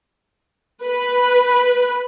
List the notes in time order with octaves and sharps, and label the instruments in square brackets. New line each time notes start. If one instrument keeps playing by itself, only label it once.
[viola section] B4